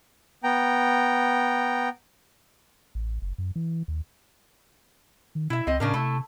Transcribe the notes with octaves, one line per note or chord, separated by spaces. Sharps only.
B3 G5 A#5
A1
F#1
F#2
E3
D#2
D#3
B2 E4 E5
C#2 C4 D#5
A2 C#3 D4 A#4
C3 A3 E4